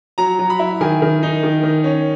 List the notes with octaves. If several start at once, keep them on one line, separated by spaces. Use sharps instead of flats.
F#3 A#5
F#3
B5
E4
D#3 G#5
D#3
D#4
D#3
D#3
C#4